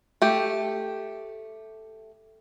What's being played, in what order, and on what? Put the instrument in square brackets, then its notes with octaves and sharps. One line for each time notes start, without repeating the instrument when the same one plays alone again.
[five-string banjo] A3 G4